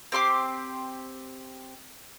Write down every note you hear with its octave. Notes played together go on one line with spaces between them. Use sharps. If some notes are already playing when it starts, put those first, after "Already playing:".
C4 G4 C6 D6